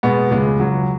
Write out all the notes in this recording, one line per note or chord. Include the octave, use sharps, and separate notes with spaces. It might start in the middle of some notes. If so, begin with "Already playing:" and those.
B2 G#3 B3
C#2 G#3
C#2 F#3